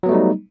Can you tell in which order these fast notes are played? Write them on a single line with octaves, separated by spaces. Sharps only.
F#3 B3 A3 G3 D#4